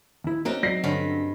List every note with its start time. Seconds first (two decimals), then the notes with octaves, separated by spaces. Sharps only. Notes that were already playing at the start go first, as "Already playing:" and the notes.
0.24 D#2 E4
0.45 A#3 C4 C#4 D#4 F#4
0.63 F#3 D5 A#6 C7
0.84 G2 D3 C#4 B6